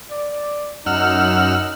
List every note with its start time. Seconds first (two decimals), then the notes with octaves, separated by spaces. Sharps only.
0.11 D5
0.86 F#2 D#4 F#5 E6 F6